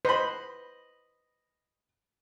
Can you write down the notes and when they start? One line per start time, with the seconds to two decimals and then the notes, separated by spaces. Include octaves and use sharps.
0.05 B4 C5 D#5 B5